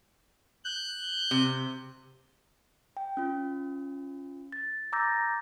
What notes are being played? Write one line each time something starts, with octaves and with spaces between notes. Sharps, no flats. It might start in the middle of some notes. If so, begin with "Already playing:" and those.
F#6 G6
C3
G5
C#4 F4
A6
A#5 D6 E6 G6 A6 A#6